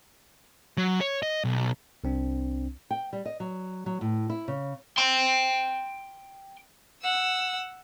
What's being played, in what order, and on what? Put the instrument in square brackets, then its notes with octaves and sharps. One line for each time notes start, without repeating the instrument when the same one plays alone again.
[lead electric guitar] F#3
C#5
D#5
B1
[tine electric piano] C2 C4 D4
[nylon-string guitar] G5
G3
D#5
F#3
F#3
A2
E4
C#3
[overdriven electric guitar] G5 C6
[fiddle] F#5 E6